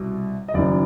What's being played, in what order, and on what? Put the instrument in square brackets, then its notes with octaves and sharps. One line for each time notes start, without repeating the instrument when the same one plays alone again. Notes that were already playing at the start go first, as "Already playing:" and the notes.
Already playing: [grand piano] C2 B2
D#5
F#1 F#2 D#3 D5